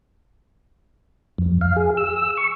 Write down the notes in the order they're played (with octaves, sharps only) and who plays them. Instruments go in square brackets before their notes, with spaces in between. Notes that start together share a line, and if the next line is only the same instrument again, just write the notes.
[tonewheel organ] F2
F5
G#4
E6
C#6